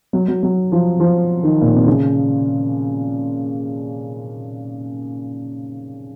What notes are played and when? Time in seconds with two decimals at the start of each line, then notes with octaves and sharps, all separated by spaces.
0.13 F#3
0.28 F#3
0.43 F#3
0.72 F3
1.00 F3
1.43 D#3
1.61 A#2
1.74 C3
1.87 C#3